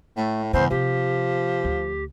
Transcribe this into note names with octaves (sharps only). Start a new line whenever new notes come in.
A2 A3
E2 G2 C#3 C5
C3 F3 G4
D2